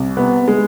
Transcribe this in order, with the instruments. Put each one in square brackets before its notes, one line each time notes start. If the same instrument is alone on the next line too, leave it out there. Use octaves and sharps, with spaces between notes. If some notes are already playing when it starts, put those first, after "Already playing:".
Already playing: [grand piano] C2
C3 B3
G#3